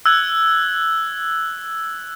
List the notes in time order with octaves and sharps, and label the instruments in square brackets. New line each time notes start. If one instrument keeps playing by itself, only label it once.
[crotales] E6 F#6 G#6 F#7